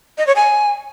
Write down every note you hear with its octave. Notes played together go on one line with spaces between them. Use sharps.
D#5
C#5
G#5